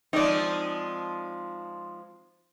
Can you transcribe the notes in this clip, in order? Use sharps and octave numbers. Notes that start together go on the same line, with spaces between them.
F3 G#3 C4 D#4 D5